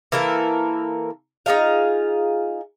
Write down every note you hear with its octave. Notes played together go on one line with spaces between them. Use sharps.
E3 A#3 A4 A#4
D#4 F4 G#4 F5